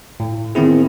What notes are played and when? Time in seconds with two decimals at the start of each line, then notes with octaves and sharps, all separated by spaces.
0.20 A2
0.55 D#3 B3 C4 E4 G#4